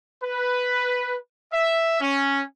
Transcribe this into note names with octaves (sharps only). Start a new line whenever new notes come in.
B4
E5
C#4